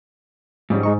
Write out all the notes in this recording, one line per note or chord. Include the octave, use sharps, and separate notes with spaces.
G#2 F3 G3 C#4
G#3 D#4 C#6